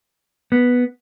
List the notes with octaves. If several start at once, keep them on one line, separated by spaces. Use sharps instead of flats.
B3